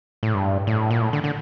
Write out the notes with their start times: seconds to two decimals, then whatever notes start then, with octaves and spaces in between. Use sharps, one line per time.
0.23 A2
0.34 G2
0.67 A2
0.91 A#2
1.02 A2
1.13 D3
1.24 D3